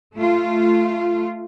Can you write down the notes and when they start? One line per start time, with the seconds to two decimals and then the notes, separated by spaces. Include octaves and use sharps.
0.18 A3 F4